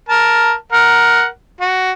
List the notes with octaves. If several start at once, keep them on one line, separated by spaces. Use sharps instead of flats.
A#4 A5
A#4 F#5
F#4